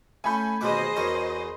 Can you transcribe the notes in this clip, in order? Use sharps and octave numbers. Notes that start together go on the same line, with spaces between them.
A3 C#4 G#5 B5 G6
A1 D#2 B2 G#4 B4 C5 D#5 D6
E2 F#4 A#4 C#5